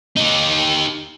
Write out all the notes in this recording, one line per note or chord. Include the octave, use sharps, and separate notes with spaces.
D#4 G4